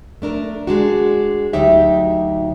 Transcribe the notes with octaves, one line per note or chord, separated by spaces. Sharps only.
A3 D4 A#4
G#3 D4 F#4
D2 F#3 D#4 G4 E5